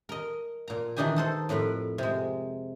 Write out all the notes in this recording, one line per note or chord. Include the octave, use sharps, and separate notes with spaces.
A#4 D#5
A#2 A#5
D#3 E3 D4 D#4 G4 G#5
D#4 A4 C5
F2 A2 A#4 B4
C3 G#3